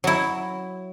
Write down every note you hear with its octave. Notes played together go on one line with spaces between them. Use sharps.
F#3 E4